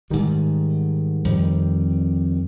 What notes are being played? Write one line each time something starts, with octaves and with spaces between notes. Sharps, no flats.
G#2 D#3 G3
F2 D#3 G3